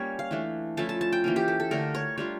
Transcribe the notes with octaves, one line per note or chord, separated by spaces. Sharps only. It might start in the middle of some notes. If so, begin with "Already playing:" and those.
Already playing: G3 A#3 C#4 G4 C#5
F5
E3 A3 D4
F3 A3 C#4 E4 A5
A5
A5
G5
E3 A#3 C#4
G4
A4
A4
D3 A3 D4 A#4
C#5
G3 D4 F4 C#5